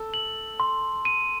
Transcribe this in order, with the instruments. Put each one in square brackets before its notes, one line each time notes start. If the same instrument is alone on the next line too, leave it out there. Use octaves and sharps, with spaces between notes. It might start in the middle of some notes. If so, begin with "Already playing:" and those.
Already playing: [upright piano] A4 [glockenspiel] E6
[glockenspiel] F#7
C6
D#7